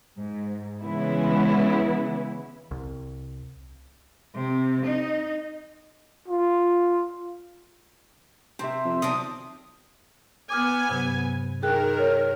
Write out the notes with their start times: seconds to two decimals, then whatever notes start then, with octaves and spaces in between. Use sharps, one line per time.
0.18 G#2
0.82 C#3 E3 G#3 B3 E4
2.71 C2
4.35 C3
4.86 D#4
6.28 F4
8.59 C3 C5 E5
8.85 F2
9.02 B1 C3 D#3 D4 D#6
10.50 B3 G#5 D6 D#6 F6
10.89 G2 C3 F#3
11.63 D#3 G#4 A#4 G5 F#6
11.99 C#5 F6